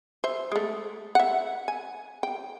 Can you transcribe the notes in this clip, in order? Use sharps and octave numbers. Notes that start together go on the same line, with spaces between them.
C5 E5
G#3 A3
E5 F#5
G#5
G5